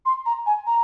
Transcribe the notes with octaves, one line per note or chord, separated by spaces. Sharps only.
C6
A#5
G#5
A#5